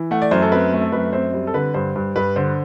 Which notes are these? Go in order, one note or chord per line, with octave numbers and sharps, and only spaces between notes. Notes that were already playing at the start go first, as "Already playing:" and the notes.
Already playing: E3
A3 F#5
D5
F#2 C5
A4
C4 B4
A3
A4
F#2 B4
C4 C5
G3 C5
A4
D3 B4
G2 C5
G2
G2 B4
D3 C5